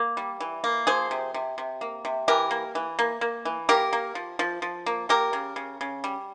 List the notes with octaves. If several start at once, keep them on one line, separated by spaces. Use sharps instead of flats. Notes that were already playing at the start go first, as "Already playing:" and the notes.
Already playing: A#3
G3
E3
A#3
F3 G#4 C5
C3
C3
C3
A#3
C3
E3 G4 A#4
A#3
E3
A#3
A#3
E3
A#3 G4 A#4
A#3
F3
F3
F3
A#3
A#3 G4 A#4
C#3
C#3
C#3
G3